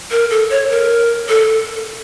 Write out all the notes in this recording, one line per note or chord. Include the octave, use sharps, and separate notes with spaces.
A#4
A4
C#5
A#4
A4